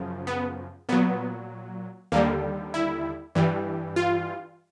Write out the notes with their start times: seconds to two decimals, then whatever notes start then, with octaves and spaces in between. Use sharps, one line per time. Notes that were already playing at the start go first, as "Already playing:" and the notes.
Already playing: F#2 C#3 F3
0.27 B3
0.89 A#2 F#3 B3
2.12 D#2 D3 G3 A#3
2.74 E4
3.35 G2 E3 G3
3.96 F4